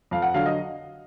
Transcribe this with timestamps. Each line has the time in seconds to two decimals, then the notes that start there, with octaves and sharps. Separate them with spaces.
0.11 F2 F5
0.22 F#5
0.34 D3 F#3 F5
0.46 D#5